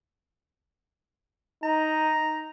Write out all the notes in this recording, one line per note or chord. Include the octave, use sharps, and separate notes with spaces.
D#4 A#5